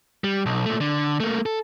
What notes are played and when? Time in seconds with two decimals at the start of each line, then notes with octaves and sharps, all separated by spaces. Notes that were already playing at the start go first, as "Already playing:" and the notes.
0.24 G3
0.46 B1
0.66 A#2 A3
0.80 D3
1.20 A3 A#3
1.46 A4